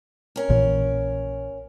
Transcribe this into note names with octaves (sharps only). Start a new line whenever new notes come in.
C#4 A#4
A#1 A#2 E3